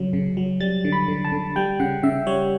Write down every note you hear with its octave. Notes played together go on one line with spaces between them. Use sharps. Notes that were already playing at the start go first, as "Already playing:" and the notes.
Already playing: C#3 F#3
C#3
F#3
G3 A6
D3
B5
D3
A5
D3
G3 G5
C#3 F#5
C#3 E5
G3 C#5